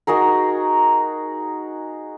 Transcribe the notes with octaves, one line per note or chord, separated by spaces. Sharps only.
D#4 F#4 G#4 A#4